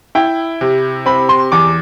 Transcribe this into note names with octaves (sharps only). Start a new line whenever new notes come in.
E4 G5
C3
C4 B5
C6
E2 D6